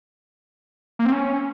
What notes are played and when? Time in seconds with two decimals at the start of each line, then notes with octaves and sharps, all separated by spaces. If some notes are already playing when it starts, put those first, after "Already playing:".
0.99 A#3
1.06 C4
1.12 C#4